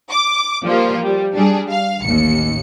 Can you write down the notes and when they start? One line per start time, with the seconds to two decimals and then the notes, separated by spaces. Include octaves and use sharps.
0.11 D6
0.65 F3 G3 A#3 F4
1.02 G3
1.33 G3 D4 G#4
1.70 F5
2.02 A1 D#2 C#7